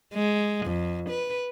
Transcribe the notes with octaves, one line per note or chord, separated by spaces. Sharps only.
G#3
F2
B4